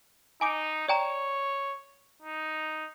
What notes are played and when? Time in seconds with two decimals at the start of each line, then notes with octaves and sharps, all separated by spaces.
0.41 D#4 G#5 D6 D7
0.89 C#5 D5 G5 A#5
2.22 D#4